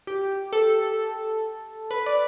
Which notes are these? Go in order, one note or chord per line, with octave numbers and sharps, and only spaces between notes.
G4
A4
B4
D5